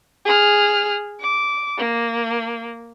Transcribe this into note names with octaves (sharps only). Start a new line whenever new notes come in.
G#4 F6
D6
A#3